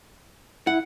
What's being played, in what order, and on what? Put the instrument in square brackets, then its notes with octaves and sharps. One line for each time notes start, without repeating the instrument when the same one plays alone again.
[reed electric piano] E4 [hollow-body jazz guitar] F#5